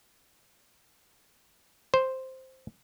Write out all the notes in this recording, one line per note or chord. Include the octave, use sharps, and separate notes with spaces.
C5